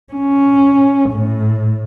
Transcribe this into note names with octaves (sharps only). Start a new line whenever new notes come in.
C#4
A2